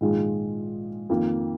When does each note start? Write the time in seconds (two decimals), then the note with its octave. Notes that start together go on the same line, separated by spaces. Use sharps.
0.01 A#1 G#2 D#3 G#3 F4
1.10 F2 D#3 A#3